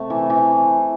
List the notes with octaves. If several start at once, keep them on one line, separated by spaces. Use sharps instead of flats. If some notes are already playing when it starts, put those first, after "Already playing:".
Already playing: C3 A3
E3
E3